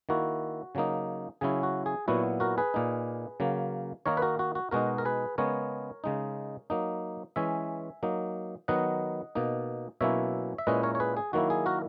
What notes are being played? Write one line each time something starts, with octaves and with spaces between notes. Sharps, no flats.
D#3 A#3 E4 F#4
C#3 F#3 A#3 D#4
C#3 F#3 C#4 E4 G#4
F#4
G#4
A#2 F#3 B3 E4 F#4
F#4 A#4
G#4 B4
A#2 A#3 D#4
C#3 F#3 A#3
D#3 A#3 D#4 A#4 C#5
B4
F#4 A#4
F#4
F#4
B2 G#3 D#4 F#4 A#4
A#4
G#4 B4
C#3 G#3 B3 A#4 C#5
C#3 G#3 D#4
F#3 A#3 D#4
E3 G#3 C#4 E5 G#5
F#3 A#3 D#4
D#3 F#3 B3 D#4 D#5 F#5
B2 A#3 D#4
B2 F#3 A#3 C#4 E4 C#5 E5
E5
A#2 G#3 C#4 E4 B4 D#5
A#4 C#5
C#5
G#4 B4
G#4
D#3 F#3 A#3 E4 F#4
G#4
F#4 A#4